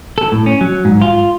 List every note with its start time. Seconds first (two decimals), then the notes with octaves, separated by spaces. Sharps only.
0.18 A4
0.32 A2
0.46 C#4
0.61 F#3
0.85 G#2
1.02 F4